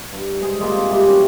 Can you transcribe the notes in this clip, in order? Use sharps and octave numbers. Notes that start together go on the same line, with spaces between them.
G2
G#2 G#4 C6
G3 G#3 A#3 F4
C4
C3 G3
E3 F#3 C#4